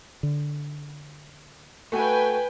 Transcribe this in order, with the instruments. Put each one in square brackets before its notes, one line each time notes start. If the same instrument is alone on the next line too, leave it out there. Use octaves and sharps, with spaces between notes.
[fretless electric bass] D3
[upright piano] A3 F#4 [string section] B4 G5 G#5